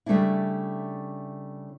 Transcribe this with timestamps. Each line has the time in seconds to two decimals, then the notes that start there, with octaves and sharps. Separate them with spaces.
0.06 C#3 G3 A3 B3 D4 E4